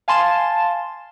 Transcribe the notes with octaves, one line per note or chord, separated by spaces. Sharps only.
F5 G#5 A5 C6 A6 E7